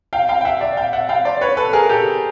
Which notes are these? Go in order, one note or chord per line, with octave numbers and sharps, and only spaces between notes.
F5 G5
F5 G5
G5
E5 F#5
D5 E5
F5 G5
E5 F#5
F5 G5
C5 D5
B4 C#5
A4 B4
G#4 A#4
G4 A4